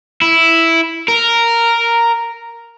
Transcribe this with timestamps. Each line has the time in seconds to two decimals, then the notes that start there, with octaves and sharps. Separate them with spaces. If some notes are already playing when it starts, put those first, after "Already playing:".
0.22 E4
1.08 A#4